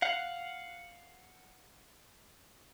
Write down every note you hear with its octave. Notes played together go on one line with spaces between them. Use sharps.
F5 F#5